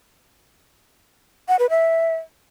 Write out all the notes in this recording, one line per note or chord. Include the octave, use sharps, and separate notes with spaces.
F#5
B4
E5